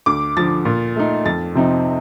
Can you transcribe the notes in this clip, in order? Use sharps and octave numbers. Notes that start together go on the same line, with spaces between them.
D2 D6
D3 F3 A6
A#2
A3 D#4
F2 A6
C3 F3 C4 D#4